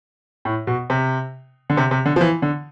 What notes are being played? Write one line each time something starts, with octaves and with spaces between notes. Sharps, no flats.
A2
B2
C3
D3
C3
C3
D3
F3
E3
D3